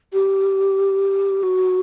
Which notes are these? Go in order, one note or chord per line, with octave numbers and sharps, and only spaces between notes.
G4
F#4